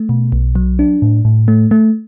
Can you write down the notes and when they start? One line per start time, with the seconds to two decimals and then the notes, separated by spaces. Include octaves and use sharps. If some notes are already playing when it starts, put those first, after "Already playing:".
Already playing: A3
0.09 B2
0.32 B1
0.55 F#3
0.79 D4
1.02 A2
1.25 A2
1.48 A3
1.71 A3